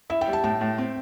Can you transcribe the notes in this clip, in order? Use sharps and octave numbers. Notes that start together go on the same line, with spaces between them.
E4 E5
G5
G3
A5
A2 A5
A2
C4